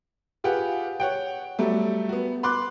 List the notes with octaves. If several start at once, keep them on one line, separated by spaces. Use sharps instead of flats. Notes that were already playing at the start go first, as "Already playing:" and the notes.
F4 G4 G#4 B4 F#5
C#5 F#5 G5
F#3 G3 A3
B3 F#4
B5 C6 D6 F#6